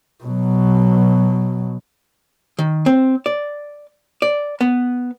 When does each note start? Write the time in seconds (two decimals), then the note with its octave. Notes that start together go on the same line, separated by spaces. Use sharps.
0.24 B2 F#3
2.59 D#3
2.86 C4
3.26 D5
4.22 D5
4.61 B3